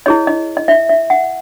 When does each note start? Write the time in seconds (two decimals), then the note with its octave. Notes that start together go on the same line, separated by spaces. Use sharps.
0.06 E4 G#4 C#5 D#5
0.27 D#5
0.57 D#5
0.68 E5
0.89 E5
1.10 F#5